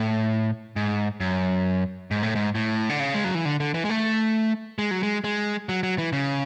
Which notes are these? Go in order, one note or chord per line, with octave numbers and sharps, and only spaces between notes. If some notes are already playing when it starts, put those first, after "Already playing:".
Already playing: A2
G#2
F#2
G#2
A2
G#2
A2
D3
C#3
G#3
F#3
E3
D3
D3
E3
G#3
A3
G#3
F#3
G#3
G#3
F#3
F#3
E3
C#3